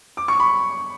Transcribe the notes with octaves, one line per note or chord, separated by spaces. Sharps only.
D6
C#6
B5